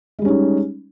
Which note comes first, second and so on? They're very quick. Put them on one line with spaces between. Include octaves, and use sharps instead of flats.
G#3 G3 C#4 D#4